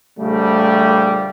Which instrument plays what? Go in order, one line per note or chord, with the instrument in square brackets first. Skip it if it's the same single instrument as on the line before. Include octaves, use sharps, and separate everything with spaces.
[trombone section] A#1 C#3 G3 [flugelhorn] A3